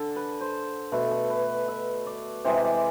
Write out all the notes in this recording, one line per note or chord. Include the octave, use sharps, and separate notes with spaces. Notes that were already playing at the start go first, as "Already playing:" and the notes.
Already playing: D3 A4
B4
C5
B2 A3 B4
A4
B4
E5
D5
C3 E3 G#3 C5
D5